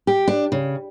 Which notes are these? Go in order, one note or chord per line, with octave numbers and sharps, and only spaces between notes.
G4
D4
C#3